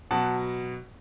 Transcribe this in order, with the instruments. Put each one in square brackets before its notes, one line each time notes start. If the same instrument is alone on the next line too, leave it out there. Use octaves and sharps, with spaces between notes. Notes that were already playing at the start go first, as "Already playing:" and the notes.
[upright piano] B2 F#3 F#5 A5